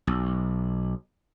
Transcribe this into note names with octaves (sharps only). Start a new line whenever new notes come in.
B1